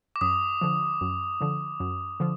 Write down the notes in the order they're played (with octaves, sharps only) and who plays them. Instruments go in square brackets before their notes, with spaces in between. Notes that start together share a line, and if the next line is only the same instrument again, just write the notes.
[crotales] D6
[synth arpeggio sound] F#2 [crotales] D#6
[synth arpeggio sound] D3 F3
F#2
D3 F3
F#2
D3 F3